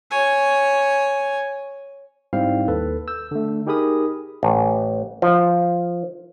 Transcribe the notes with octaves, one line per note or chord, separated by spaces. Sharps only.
C#5 G#5
G#2 G3 C4 E4 C5 F5
D#2 A4 B4
E6 G6
D3 A3
D#4 G4 G#4 A#4 B5 D#6
A1
F3